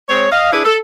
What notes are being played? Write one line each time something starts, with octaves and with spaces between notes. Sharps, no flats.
G#3 C4 C#5
D#5 F5
D4 E4 G#4 B4
A4